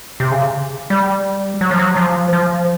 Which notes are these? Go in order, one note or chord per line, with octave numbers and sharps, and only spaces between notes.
C3
C#3
G3
F#3
F3
F#3
F3
F3